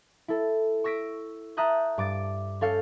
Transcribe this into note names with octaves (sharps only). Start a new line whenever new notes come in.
E4 A4
C#6 E6 A#6 B6 D7
E5 A5 A#5 D#6 F#6 G6
G2 D6 A6 D7
C#4 A4 F5 G6 C#7